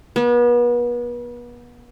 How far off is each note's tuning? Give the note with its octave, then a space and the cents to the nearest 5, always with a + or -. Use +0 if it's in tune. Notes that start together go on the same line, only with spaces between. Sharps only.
B3 -35